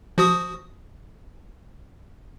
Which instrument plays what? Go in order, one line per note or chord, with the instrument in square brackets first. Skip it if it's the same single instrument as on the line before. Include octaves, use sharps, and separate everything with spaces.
[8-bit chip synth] F3 F#4 D#6